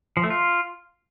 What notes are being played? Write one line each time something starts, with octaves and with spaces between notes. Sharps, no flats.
F3
A3
F4